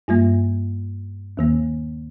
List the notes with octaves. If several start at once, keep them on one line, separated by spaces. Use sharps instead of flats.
G2 G3 A#3 F4
D#2 D#3 A#3